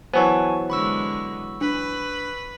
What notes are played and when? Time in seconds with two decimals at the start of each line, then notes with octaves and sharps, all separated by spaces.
0.14 E3 F#3 B3 C5 G#5 A5 C#6
0.70 D3 G#3 B5 C#6 E6
1.61 D4 B4